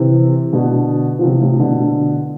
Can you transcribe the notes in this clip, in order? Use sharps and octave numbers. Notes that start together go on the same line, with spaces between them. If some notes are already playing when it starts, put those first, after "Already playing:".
Already playing: C3 E3
B2 D3
F3
C3 E3
A2 C3
B2 D3